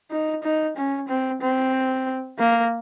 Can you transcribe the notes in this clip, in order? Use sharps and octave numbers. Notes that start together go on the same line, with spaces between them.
D#4
D#4
C#4
C4
C4
A#3